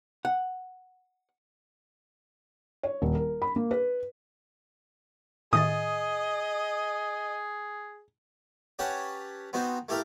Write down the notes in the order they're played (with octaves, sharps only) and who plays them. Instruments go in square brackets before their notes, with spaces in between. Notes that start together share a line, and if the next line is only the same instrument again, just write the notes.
[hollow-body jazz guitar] F#5
[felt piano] C#5
D#1
A#4
B5
A#3
B4
[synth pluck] A2 D#3 A6 [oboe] G#4 [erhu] D#5 [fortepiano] D#6
[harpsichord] C#4 G4 B4 C#5 F#5 A5
B3 C4 D#4 F#4 C5
A3 E4 G4 A4 A#4 F5